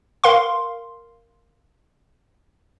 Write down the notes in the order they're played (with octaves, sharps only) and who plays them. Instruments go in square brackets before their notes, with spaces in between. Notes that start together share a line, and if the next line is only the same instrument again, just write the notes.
[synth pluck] A#4 F5 C6